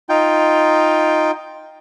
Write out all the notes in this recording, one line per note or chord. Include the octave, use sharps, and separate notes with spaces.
D#4 F4 G5